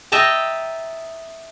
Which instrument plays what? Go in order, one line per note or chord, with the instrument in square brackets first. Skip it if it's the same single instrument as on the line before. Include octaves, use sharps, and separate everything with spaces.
[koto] D#5 E5 G5 A5 A#5